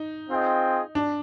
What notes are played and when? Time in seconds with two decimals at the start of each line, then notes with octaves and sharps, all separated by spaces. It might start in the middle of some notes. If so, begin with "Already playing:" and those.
Already playing: D#4
0.30 C4 F4 G#4 D#5 G5
0.95 D4